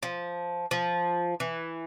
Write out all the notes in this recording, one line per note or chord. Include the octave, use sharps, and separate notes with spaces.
F3
F3
E3